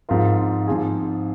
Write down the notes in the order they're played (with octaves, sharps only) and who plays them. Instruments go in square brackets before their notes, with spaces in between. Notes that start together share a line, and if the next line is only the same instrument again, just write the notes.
[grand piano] G#2 F3 C4 F4 A#4
G#2 F3 C4 F4 G#4